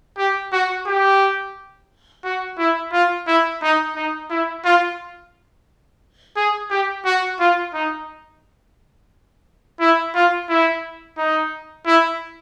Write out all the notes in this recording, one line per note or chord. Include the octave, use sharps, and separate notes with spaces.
G4
F#4
G4
F#4
E4
F4
E4
D#4
D#4
E4
F4
G#4
G4
F#4
F4
D#4
E4
F4
E4
D#4
E4